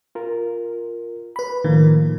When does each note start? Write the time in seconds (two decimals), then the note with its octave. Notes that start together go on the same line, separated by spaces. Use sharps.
0.15 F4 A#4
1.36 B4 B5
1.64 A2 D#3 F3 A#3